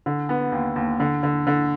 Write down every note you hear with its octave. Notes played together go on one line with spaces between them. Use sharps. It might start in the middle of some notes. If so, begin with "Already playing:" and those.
D3
B3
D#2
D#2
D3
D3
D3